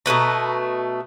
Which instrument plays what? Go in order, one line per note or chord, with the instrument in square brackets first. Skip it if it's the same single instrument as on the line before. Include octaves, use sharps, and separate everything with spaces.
[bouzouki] B2 A3 B4 A#5